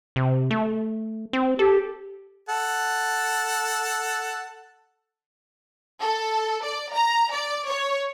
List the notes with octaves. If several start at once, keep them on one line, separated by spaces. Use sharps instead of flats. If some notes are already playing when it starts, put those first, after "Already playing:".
C3
A3
C4
G4 A4
A4 F#5 A5
A4
D5
A#5
D5
C#5